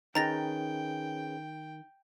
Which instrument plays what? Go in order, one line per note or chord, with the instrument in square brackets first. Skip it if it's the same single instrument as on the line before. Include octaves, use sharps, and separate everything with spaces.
[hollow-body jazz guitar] D#3 [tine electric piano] C#4 G#4 B4 [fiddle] G5 [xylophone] A#5 A6 A#6